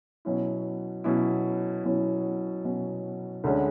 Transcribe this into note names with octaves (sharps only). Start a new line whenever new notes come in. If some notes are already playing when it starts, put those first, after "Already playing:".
B2 F#3 C#4 E4
B2 F#3 C#4 E4
B2 F#3 C#4 E4
B2 F#3 C#4 E4
D2 D3 G#3 C#4